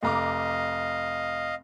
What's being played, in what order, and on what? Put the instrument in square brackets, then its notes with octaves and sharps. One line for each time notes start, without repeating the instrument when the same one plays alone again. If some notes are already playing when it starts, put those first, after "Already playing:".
[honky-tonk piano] F1 A#5 D6 [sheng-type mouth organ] D#5 F5